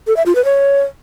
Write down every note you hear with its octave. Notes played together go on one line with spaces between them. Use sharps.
A4
E5
F4
B4
C#5